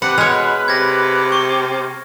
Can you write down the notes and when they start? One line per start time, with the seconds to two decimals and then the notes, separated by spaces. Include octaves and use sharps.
0.02 C3 B4 F#5
0.18 B2 G#3 C#5 F6 F7
0.68 C3 G#6 A#6
1.32 C#6